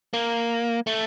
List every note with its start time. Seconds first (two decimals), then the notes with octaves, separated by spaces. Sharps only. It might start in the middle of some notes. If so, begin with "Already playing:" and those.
0.13 A#3
0.87 A3